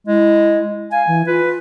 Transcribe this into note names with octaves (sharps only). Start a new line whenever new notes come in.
G#3 E4
F5 G#5
E3
F4 B4